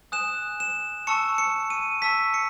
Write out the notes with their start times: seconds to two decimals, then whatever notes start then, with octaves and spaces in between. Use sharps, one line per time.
0.12 G#5 D#6 F#6 E7
0.60 E7
1.07 A5 C#6 E6 C#7
1.38 C#7
1.70 D#7
2.02 A5 C#6 E6 B6
2.34 C#7